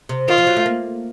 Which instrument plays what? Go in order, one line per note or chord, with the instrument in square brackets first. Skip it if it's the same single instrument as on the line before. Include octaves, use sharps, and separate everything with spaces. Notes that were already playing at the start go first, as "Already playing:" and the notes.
[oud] C3
[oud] D#3 [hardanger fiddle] F4
[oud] F3
F#3
A3
A#3